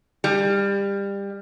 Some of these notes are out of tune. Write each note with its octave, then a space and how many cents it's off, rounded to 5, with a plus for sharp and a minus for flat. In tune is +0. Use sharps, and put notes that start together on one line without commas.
G3 +25